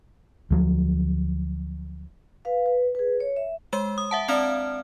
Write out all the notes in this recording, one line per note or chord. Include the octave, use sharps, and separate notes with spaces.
D2 F3 F#3
B4 F5
B4
G#4 B4
C#5
E5
G#3 C5
D#6
E5 F#5 A5
C4 D4 A#5 F6